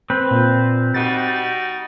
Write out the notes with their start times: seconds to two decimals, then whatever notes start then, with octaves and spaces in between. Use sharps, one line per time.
0.10 C4 B4
0.31 A#2
0.94 G3 D#4 F#4 A6